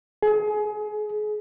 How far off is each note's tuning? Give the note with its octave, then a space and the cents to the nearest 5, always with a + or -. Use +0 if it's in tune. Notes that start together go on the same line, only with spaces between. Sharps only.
G#4 +30